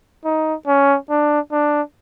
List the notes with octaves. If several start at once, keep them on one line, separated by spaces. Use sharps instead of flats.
D#4
C#4
D4
D4